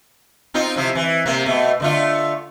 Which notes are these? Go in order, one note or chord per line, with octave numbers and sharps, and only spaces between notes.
C4 D#4 F4
C3 F3 E4
E3
C3 A#3
B2 A3
D3 A3 F4